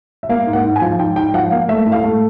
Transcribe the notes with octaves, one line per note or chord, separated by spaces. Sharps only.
E5
A#3 F5
G#2
F#5
G#2
G#5
F3
G#2 G5
G#2 G5
F3 F#5
A#3 F5
A3 E5
A2
F5
A3